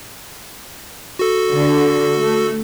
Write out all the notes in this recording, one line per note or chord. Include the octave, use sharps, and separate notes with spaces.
F#4 A4
D3
A3